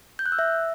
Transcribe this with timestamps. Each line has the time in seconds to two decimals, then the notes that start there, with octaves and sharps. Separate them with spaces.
0.19 G6
0.26 F#6
0.32 E6
0.39 E5